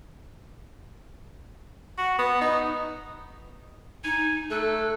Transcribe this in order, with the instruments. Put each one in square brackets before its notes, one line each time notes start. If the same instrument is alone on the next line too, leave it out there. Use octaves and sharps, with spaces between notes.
[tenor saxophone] F#4
B3
D#4
[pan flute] D#4 [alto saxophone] G#5
[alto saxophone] A3 [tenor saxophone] A4 [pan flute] F#6